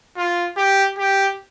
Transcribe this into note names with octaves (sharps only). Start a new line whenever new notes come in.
F4
G4
G4